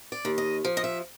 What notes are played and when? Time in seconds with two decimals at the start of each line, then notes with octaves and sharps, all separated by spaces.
0.12 D5
0.25 D#2
0.38 D#5
0.65 F3
0.77 D#5
0.84 E5